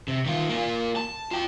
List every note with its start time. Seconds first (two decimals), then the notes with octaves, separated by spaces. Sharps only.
0.08 C3
0.26 D#3 F4
0.49 A#3 F4
0.96 A5
1.31 F4 G5